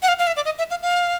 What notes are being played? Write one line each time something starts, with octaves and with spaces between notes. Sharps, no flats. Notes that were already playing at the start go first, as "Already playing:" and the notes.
F#5
F5
F5
E5
D5
D#5
E5
F5
F5